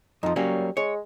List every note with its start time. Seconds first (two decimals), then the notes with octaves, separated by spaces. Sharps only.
0.23 F2 F3 D#4
0.36 F#3 G3 A#3 C#4
0.77 G#3 C#5